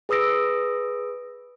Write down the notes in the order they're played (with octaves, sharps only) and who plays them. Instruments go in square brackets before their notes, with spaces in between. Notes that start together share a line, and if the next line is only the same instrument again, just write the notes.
[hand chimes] G#4 B4 D#6 E6 A#6 D7